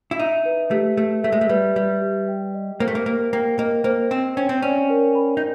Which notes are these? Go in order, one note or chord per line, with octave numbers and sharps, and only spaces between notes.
E4
D#4 E5
B4
A3 G4
A3 G4
A3 E5
G#3
A3
G3 B4
G3 G4
G4
G5
D#5
A#3 C5
A3
A#3
A#3 C5
A#3 G5
A#3 D#5
A#3 C5
C4 C5
C#4 G5
C4
C#4 D5
A#4
B5
D#4